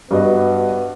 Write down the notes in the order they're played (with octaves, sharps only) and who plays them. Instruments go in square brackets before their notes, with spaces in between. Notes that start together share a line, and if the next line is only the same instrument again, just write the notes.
[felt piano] G2 F#4 D#5 [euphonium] B3